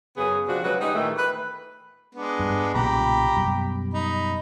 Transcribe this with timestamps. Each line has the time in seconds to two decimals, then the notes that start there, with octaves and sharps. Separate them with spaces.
0.17 F#2 C#3 B3 G#4
0.48 C3 F3 D4 F#4
0.64 C#3 F#3 G#3 F#4 B4
0.81 G3 G#3 D#4
0.95 A#2 D#3 E3 A3
1.18 B4
2.15 G#3 B3 D4
2.40 G2
2.74 B1 A#2 C#3 G4 A#5 B5
3.37 F#2 B2 G3
3.94 D#4 B5